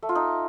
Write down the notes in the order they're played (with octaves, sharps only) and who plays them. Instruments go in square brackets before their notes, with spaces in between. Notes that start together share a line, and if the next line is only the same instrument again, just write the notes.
[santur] A3
F4
D#4